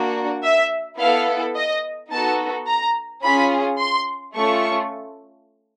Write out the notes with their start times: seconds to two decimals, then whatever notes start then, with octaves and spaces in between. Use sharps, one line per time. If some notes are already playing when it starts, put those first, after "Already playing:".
Already playing: A#3 D4 F#4
0.43 E5
0.99 B3 E4 A4 F5
1.55 D#5
2.11 B3 D#4 F#4 A4 A5
2.67 A#5
3.23 C#4 F4 G#4 B5
3.79 C6
4.35 A3 C#4 F4 A4 C#6